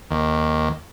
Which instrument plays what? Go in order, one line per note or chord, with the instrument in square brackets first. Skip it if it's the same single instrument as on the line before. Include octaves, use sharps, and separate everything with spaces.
[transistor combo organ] D#2